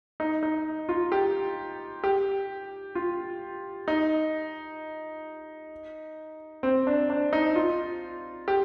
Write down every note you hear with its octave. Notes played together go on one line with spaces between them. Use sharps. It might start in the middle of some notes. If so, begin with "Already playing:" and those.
D#4
D#4
F4
G4
G4
F4
D#4
C4
D4
D4
D#4
F4
G4